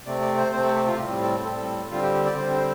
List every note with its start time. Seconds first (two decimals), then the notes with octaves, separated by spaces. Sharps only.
0.06 C3 A3 C4 D5
0.22 D5
0.37 C5
0.52 C3 A3 C4 C5
0.63 A4
0.75 G4
0.87 F4
0.98 A2 G3 C4 G4
1.11 G4
1.22 A4
1.45 A2 G3 C4 A4
1.90 D3 G3 C4 F4
2.02 G4
2.14 G4
2.26 D5
2.37 D3 G3 C4 C5
2.53 C5